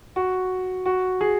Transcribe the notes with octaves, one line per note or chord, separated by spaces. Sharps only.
F#4
F#4
G#4